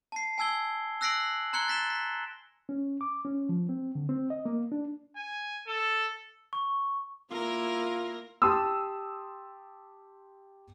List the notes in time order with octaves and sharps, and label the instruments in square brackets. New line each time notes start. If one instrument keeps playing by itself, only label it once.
[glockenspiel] A5 C7
G#5 A5 E6 G#6 G7
E6 F#6 A#6 C7 D7 F#7
A#5 C6 F#6 G#6 C#7 G7
A6 B6 E7 G7
B6
[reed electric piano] C#4
D6
C#4
F3
C4
D3
C4
D#5
A#3
D4
[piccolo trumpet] G#5
A4
[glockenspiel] C#6
[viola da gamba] A#3 E4 A#4 [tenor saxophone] F4
[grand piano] G4 A5 C6 D#6 E6